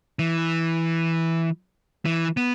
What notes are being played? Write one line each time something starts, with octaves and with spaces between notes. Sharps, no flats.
E3
E3
B3